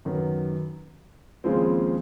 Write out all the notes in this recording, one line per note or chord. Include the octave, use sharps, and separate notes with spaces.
F#2 D#3 F#3 B3
D#2 C#3 F3 G#3 C4